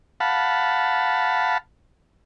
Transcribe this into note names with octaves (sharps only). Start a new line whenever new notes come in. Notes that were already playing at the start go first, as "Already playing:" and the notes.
F5 F#5 A5 B5